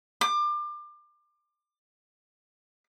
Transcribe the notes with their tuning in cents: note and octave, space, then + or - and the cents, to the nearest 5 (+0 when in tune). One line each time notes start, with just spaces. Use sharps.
D6 +30